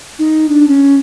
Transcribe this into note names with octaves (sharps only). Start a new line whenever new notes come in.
D#4
D4
C#4